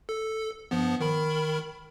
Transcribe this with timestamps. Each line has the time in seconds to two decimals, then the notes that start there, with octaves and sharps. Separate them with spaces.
0.09 A4
0.71 G2 F3 B3
1.00 D#3 A#4 B5